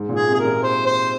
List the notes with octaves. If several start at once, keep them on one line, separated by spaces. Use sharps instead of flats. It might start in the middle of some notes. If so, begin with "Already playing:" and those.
Already playing: G#2
A#2
G#4
C3
G#4
A#4
A#2
C5
C5